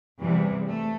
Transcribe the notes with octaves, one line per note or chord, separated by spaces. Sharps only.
E2 C3 E3 G3
A3